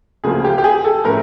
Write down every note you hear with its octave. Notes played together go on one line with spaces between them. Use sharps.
D2 C#3 F3 A#3 G#4
G4
G4
G#4
A4
A2 F3 A3 C#4 A#4